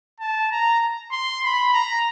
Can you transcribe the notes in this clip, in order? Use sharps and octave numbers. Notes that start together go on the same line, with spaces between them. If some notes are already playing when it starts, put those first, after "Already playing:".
A5
A#5
C6
B5
A#5